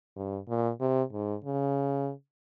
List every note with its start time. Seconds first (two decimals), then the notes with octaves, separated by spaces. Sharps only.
0.16 G2
0.49 A#2
0.80 C3
1.13 G#2
1.44 C#3